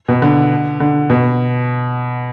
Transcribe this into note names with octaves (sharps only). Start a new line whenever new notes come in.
B2
D3
D3
B2